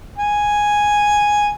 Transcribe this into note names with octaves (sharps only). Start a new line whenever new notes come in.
G#5